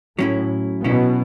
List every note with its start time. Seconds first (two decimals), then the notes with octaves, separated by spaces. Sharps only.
0.18 A2 F#3 C#4 E4
0.84 B2 F#3 C#4 E4